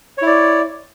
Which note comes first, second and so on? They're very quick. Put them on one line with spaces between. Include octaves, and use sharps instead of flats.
C#5 E4 D5